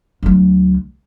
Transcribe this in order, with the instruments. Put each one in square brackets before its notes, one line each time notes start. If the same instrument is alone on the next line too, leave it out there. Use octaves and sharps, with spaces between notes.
[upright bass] D2 F#3